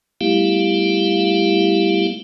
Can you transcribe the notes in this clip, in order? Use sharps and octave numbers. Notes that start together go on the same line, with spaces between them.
G3 A3 B3 E4 G4 F5